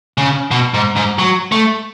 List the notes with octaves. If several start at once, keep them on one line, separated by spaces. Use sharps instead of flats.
C#3
B2
G#2
G#2
F#3
A3